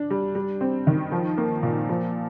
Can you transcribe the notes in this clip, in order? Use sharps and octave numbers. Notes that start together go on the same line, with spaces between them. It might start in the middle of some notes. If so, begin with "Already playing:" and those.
Already playing: D4
G3
G3
C4
D#3
F3
A#3
A#2
F3